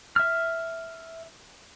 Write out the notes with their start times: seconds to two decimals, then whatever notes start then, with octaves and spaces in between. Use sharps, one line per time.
0.16 E5 F6